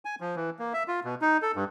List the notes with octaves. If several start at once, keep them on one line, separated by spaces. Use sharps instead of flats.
G#5
F3
E3
A#3
E5
F4
B2
D#4
A4
G2